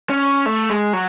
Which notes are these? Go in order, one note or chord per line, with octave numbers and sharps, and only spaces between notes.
C#4
A3
G#3
F#3